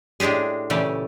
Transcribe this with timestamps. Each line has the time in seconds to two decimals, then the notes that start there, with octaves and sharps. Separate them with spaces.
0.20 A2 G#3 D4 G4 G#4
0.70 A#2 C#3 E3 A3 G4